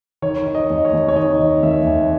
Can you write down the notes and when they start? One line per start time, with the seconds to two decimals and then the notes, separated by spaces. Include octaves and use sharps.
0.22 D#3 C#5
0.47 D#3
0.55 D#5
0.70 D#2
0.85 C#5
0.93 D#2
1.08 C#5
1.16 D#3 D#5
1.40 D#3
1.63 D#2 E5
1.87 D#2